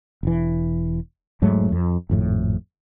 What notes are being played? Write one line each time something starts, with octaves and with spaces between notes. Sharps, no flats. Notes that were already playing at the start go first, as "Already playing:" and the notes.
E1 E3
E1 G#2 F#3 A3
F2
G#1 F2 A2